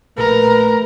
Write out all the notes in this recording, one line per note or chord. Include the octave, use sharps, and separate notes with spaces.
A#1 A3 A#4 B4